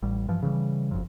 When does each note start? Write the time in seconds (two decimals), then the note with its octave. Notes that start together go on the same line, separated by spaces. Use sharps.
0.03 A1 G3
0.28 G2 E3 F3
0.42 C#3 E3 G3
0.91 F#1 F2